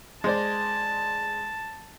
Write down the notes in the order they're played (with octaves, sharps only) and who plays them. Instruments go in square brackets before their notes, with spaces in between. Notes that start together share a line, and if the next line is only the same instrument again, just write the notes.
[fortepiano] G#3 C5 D5 [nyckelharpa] A5